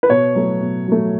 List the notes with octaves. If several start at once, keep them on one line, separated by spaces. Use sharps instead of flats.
B4
B2 C#5
F#3 A3
B2
F#3 A3